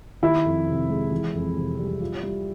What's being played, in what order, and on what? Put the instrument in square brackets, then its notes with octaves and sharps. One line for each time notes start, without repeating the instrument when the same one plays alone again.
[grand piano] D#3 [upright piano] E4
[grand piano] F2
C3
G#3
E3
F2
C3
G3
F4
G3